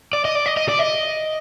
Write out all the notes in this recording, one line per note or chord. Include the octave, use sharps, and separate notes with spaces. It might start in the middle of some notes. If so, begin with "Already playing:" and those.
D5
D#5
D5
D#5
D#5
D5
D#5